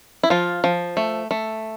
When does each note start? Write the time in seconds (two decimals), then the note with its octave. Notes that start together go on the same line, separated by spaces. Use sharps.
0.23 E4
0.30 F3 F4
0.64 F3
0.97 A3
1.31 A3